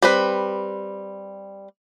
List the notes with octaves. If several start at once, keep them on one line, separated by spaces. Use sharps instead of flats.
G3 C4 B4